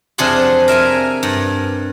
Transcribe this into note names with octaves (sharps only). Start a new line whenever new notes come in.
F2 C3 D4 G#4 F#5 C6
A#4 E5 F5 G#5
G2